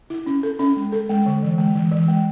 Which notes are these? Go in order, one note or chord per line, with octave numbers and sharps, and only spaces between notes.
E4
C#4
A4
C#4
G#3
A4
G#3
D3
E3
G#3
E3
E3
G#3